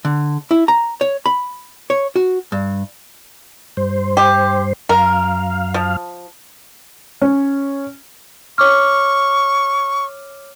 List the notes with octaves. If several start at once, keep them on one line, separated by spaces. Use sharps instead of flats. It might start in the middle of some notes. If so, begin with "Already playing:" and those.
D3
E4
A#5
C#5
B5
C#5
F#4
G2
G2 C5
G4
F#2 A#4 F5
F3
C#4
C#5 C#6 D6 F6